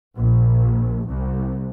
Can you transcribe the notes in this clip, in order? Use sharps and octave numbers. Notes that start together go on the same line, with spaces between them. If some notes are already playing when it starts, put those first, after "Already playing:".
A#1
C2